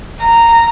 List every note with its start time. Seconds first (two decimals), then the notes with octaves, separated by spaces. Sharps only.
0.22 A#5